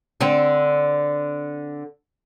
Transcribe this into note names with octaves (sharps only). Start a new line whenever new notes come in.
D3 C4